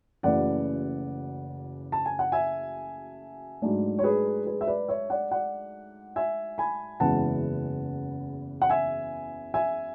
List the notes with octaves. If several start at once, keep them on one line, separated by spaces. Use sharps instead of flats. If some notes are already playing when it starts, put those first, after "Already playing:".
F#1 F#2 C#3 E3 A3 D5 F#5
A5
G#5
F#5
E5 G#5
G#2 F#3 A3 D4
C#5
G#4 B4
G#4 B4
E5
B4 D5
C#5 E5
D5 F#5
D5 F#5
E5 G#5
G#5 B5
F#1 E2 C#3 E3 G#3 F#5 A5
F#5
E5 G#5
E5 G#5